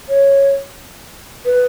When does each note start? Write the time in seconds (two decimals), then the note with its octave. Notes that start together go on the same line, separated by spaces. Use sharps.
0.09 C#5
1.46 B4